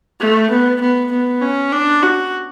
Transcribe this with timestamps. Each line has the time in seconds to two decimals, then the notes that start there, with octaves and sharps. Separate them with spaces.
0.21 A3
0.51 B3
0.81 B3
1.12 B3
1.41 C#4
1.73 D4
2.03 F#4